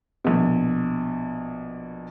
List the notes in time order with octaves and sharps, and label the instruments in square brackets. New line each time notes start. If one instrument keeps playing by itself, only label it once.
[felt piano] A#1 B2